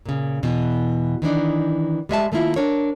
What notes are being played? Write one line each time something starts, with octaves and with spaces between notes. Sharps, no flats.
A#2 C#3
E2 B2 E3
D#3 E3 D4 D#4
G3 G#3 E5 A5
D#3 A3 A#3 E4 F4
D4 A#4 C#5